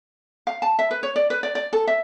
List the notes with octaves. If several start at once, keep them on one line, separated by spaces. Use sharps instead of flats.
F5
A5
E5
B4
C#5
D5
B4
D5
D5
A4
E5